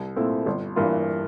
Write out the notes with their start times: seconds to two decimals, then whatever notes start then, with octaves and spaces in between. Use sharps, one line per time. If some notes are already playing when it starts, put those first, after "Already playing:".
Already playing: C2
0.16 A#2 A3 C4 E4
0.46 G1
0.76 G2 E3 A#3 F4